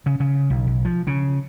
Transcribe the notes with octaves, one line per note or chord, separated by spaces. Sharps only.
C#3
C#3
B1
B1
F3
C#3